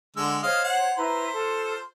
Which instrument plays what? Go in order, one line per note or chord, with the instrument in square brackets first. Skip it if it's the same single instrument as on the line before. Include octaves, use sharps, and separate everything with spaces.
[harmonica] D3 G#3 E6
[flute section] C5 C#5 [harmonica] D#5 F5
[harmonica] F#5
[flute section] E4 B4 A#5 [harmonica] C5
[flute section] F4 A4